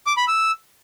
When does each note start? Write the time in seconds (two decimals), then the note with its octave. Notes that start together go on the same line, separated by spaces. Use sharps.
0.07 D6
0.17 B5
0.28 E6